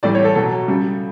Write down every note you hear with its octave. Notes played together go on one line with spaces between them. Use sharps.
A2 E3 G3 D5
C#5
A4
B2 F#3 A4
C#3 G3